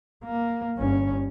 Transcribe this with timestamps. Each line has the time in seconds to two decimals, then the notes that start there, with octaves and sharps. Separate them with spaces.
0.24 A#3
0.78 G1 C#4